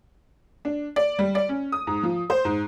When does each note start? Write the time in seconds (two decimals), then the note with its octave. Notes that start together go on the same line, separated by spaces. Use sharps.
0.65 D4
0.96 D5
1.19 G3
1.35 D5
1.49 C#4
1.72 D#6
1.87 G#2
2.03 F3
2.30 C5
2.45 G#2